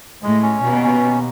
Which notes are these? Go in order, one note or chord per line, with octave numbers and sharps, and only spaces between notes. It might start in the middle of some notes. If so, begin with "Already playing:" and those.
A2 G#3
C#4
D#2 B2
C#4
D#2